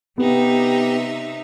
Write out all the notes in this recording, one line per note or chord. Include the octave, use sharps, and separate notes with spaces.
C3 B3 D#4 G4 E5